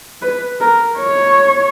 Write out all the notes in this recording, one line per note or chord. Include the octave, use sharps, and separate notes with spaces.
B4
A#4
C#5